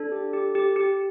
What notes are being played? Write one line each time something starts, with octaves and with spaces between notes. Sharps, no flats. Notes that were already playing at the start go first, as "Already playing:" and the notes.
Already playing: D4 A4
G4
G4
G4
G4